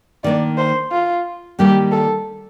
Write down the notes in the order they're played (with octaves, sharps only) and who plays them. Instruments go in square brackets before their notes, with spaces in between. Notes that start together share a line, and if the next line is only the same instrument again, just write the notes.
[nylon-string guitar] D#3 A#3 D4 [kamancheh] D5
[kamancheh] C5
F4
[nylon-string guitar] D#3 G3 A#3 D4 [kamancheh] G4
[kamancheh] A4